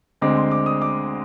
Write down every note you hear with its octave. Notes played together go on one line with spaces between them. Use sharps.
D2 D3 G#3 C4 D6
C6
D6
D#6
D6